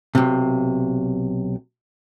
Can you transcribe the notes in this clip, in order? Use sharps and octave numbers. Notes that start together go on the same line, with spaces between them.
B1 C3